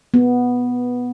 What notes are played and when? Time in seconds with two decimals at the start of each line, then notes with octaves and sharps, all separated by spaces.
0.14 B3